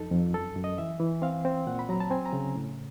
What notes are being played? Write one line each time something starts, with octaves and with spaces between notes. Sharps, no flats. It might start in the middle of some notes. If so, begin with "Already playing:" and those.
Already playing: F2 D#4 A4
F2
F#2 A4
F#2
D#5
E3 E5
E3
C4 F5
C4
A#2 F#5
B5
F#3 A#5
A5
C4 G#5
A#5
C#3
A2